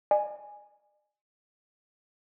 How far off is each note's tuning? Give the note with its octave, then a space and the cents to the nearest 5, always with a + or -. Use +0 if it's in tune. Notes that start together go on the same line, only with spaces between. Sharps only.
D5 +45 G#5 +0